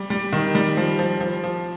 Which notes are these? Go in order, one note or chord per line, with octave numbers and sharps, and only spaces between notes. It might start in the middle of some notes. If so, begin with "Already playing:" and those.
Already playing: G3
G3
D#3
G3
F3
F3
F3
F3